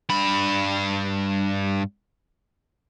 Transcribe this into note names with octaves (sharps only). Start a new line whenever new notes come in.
G2 B5